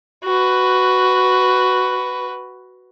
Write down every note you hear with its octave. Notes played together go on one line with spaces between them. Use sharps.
F#4 B4